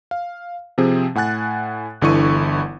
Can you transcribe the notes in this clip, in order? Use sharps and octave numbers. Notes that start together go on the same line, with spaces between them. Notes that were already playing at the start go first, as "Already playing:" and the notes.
F5
C3 F3 C4 G#4
A2 F#5 G#5 F#6 A6
G1 D3 E3 E4 C#6 D#7